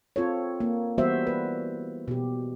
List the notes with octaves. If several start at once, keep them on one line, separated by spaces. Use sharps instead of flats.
C4 F4 A4 C#5
A#3
E3 G3 B3 F#4 C5 E5
B4
B2 G4